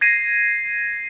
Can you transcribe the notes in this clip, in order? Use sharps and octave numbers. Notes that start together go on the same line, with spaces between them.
G#6 A#6 C7 D#7